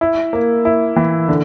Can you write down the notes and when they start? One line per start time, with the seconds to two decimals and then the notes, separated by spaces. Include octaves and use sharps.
0.01 E4
0.33 A#3
0.65 E4
0.96 E3
1.28 D3